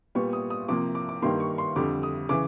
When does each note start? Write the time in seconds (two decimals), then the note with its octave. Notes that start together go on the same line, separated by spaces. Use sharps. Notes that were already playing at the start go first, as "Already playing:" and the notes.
0.15 A#2 G3 B3 C#6
0.33 D#6
0.50 D#6
0.69 C3 F3 A#3 D6
0.95 D6
1.09 D6
1.22 G2 D#3 G3 A#3 C6
1.40 C#6
1.58 C6
1.76 F2 D3 G3 D6
2.03 D#6
2.29 C#3 E3 D6